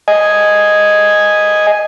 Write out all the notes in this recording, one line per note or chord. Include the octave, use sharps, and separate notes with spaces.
D#5 G#5